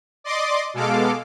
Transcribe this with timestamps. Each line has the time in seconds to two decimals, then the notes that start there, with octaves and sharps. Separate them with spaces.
0.24 D5 D#5 C6 D6
0.74 B2 G#3 A4 F5 D6